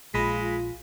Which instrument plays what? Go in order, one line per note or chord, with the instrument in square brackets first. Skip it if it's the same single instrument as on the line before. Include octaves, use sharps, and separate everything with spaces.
[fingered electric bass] A#1 [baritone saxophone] G#3 [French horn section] F4 [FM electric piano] B5 A#6 B6